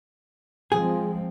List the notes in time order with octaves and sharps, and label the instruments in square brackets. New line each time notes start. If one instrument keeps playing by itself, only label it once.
[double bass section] F3 G#3 C4 [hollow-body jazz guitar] G#4